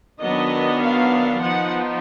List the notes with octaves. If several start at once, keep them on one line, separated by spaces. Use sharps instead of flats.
D#3 F#3 B3 D4 D#5
F5
F3 B3 D#4 F#5